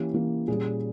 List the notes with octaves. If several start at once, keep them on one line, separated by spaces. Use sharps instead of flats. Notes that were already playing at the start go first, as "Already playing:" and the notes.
Already playing: E3 A#3 C#4 G4
E3 A#3 C#4
A#2 G3 C#4 G#4